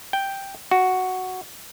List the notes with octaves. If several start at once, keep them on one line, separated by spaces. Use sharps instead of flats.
G5
F#4